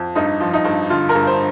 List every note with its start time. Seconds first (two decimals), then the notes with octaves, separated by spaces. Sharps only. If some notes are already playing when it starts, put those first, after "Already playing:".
Already playing: F2
0.15 G2 D#4
0.40 F3
0.53 D#4
0.65 G2
0.90 D3 F4
1.09 A#4
1.15 G2
1.27 C5